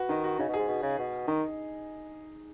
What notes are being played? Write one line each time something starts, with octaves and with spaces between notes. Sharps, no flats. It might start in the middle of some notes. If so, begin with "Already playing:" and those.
Already playing: F#4 B4
D#3 D#4
F#4
C#3 D#4
B2
G#4
G#2
B2
C#3
B2
D#3 D#4